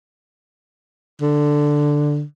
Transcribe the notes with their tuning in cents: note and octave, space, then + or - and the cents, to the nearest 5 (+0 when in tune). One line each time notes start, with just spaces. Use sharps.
D3 +5